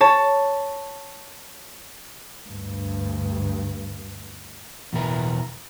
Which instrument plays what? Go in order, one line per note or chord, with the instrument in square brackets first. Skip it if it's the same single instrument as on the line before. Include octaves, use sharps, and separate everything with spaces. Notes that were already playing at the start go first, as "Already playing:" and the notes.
[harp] C#5 A5
[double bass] D2 G2
[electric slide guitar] E2 B2 E4 A#4 B4